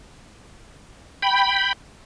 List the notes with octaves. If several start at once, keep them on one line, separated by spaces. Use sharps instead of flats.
G5 B5